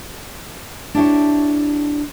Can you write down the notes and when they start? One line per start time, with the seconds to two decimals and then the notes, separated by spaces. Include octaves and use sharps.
0.95 D4 E4 G4 C#5